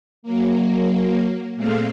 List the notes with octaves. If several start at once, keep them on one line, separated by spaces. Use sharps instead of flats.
F#3 A#3
A#2 G#3 A3 C4 F5